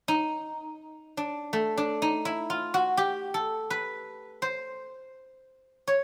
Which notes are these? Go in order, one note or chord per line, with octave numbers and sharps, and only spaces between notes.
D#4
D4
A3
D4
D#4
E4
F4
F#4
G4
A4
B4
C5
C#5